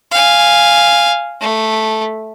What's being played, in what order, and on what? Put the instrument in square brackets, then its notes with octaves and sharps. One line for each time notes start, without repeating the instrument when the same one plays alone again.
[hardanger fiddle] F5 G#5
A3